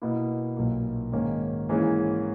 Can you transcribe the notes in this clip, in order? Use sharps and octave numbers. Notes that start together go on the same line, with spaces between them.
B2 A#3 E4
B1 A#2 A#3
G#2 D#3 A#3 C#4
G#2 E3 A#3 C#4 G#4